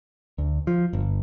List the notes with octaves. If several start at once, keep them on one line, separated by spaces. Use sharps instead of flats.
D2
F3
G1